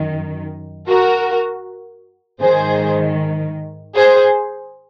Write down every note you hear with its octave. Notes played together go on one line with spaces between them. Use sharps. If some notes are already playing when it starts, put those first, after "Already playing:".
Already playing: F#2 D#3
F#4 A#4
G#2 D#3 G#4 C5
G#4 C5